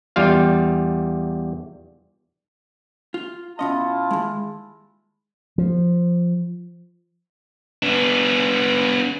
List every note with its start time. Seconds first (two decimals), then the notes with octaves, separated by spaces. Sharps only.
0.16 E2 G3 F4 F5
3.14 F4
3.59 B2 C#4 E4 F4 D#5 A5
4.11 D#2 G#3
5.58 F3
7.83 B3 D4